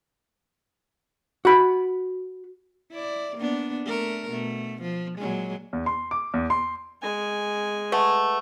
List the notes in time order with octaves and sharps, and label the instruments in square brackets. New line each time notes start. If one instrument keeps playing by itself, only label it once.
[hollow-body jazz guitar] F#4 B5
[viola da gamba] E4 D5
A#3 B3 D4
A3 A#4
B2 A3
F3
A#2 F#3 G#3
[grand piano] E2
C6
D6
E2
C6
[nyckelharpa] G#3 G#5
[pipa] A3 [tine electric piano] B4 F#5 A5